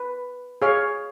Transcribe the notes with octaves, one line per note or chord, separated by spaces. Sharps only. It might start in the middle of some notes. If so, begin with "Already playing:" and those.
Already playing: B4
G#4 C#5 F5